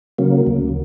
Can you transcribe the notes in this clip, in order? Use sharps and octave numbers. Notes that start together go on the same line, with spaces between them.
C#3 F#3 A#3
D2